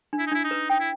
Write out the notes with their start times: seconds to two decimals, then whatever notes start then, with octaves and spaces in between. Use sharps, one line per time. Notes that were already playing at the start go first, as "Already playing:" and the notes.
0.13 D4
0.19 E4
0.27 D#4
0.31 D4 E4
0.44 D#4
0.51 B4
0.70 D#4 G5
0.80 E4